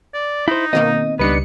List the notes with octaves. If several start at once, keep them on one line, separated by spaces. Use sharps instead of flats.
D5
D#4 E4 C5
B2 D#3 A#3 C4 D#5
C#2 G3 B3 D4 D#4 B4 C#7